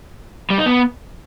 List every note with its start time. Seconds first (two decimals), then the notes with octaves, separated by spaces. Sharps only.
0.50 G3
0.58 D#4
0.66 B3